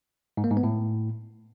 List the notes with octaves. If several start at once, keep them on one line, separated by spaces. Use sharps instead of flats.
G#2
A#3
G#2
B3
A2